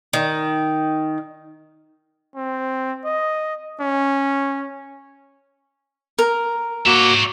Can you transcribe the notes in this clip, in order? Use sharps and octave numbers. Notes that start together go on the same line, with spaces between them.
D#3
C4
D#5
C#4
A#4
A#3 F#4 C#5 E5